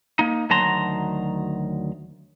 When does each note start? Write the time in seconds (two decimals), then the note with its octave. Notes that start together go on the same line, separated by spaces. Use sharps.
0.19 A#3 D#4
0.50 D2 D#3 F#3 A5 A#5 C6